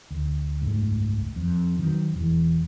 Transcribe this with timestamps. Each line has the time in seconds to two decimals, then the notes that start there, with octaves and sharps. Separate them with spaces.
0.11 D2
0.62 F#1 C#2 G#2 A3
1.36 F2
1.79 D#3 F#3
2.13 E1 E2 E3